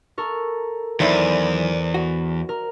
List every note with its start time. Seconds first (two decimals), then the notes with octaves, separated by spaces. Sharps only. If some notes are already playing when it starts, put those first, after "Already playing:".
0.18 A4 A#4 C#6
1.00 E2 D#3 F#3 E4 C5 D5
1.94 F#4
2.49 A#4